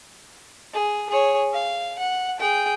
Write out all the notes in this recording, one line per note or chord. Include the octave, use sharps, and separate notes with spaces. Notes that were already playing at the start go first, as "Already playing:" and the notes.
G#4
G#4 C#5
F5
F#5
G#4 G5